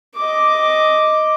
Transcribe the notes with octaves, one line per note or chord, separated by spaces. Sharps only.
D#5 D6